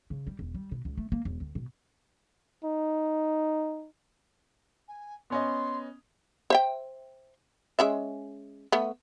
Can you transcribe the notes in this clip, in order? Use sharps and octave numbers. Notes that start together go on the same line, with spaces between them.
C#3
G3
E1
G3
B2
C#2
A3
A#3
E1
D2
B2
D#4
G#5
B3 C#4 D#5 C6
C5 E5 G5
G#3 C#4 E5
A3 B3